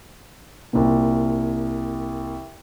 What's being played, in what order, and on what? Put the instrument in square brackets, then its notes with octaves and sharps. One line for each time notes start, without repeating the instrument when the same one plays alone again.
[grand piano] C2 A#2